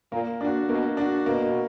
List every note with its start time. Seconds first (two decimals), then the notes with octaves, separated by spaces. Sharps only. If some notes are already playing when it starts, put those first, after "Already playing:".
0.12 A#2 A#3
0.40 A#2 D4 F#4
0.69 B2 A#3
0.97 D4 F#4
1.26 B2 A#3